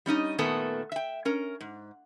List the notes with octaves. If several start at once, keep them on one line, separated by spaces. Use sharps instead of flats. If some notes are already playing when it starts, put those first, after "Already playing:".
G3 C#4 D#4 D#5
A#2 D#3 A3 B3 A4 G#5
E5 G5
C#4 A#4
G#2